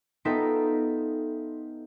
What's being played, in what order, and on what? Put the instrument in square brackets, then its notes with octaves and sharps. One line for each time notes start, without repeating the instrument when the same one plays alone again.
[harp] B3 D#4 F4 A4 E5 G5